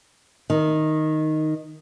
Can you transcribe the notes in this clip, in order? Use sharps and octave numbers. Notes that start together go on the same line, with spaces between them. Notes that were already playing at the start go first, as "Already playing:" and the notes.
D#3